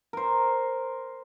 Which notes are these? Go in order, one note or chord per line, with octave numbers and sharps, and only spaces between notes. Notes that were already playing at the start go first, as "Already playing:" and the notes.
A#4 C5